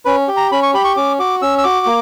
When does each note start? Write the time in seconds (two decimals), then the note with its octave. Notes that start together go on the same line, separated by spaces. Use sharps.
0.05 C#4 B4
0.28 G4
0.37 A#5
0.52 C#4 B5
0.63 C#6
0.74 G4 B5
0.85 C#6
0.96 C#4 D6
1.19 F#4 D6
1.42 C#4 E6
1.58 E6
1.64 F#4 D6
1.86 A#3